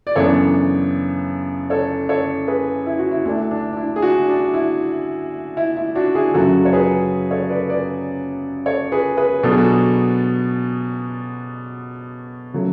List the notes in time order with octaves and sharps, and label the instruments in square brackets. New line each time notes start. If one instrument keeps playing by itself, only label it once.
[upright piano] D5
F#2 C#3 E3 B3 D4 A4 C#5
A4 C#5
A4 C#5
G#4 B4
E4
F#4
E4
D2 D3 A3 D4 E4
D4
D4
E4
G#4
D4 F#4
D4
E4
E4
E4
D4 F#4
E4 G#4
F#2 C#3 F#3 C#4 F#4 A4
C#5
G#4 B4
A4 C#5
B4 D5
B4 D5
A4 C#5
G#4 B4
G#4 B4
B2 F#3 B3 D4 A4
G#4
F#4 A4
C#3 F#3 A3